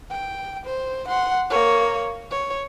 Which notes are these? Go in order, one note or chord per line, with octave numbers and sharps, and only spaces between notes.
G5
C5
F#5 C6
A#3 C#5
C#5